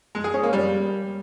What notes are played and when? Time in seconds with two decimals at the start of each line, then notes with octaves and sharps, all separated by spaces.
0.15 G#3
0.24 G#4
0.34 C#4
0.43 A#3
0.53 G3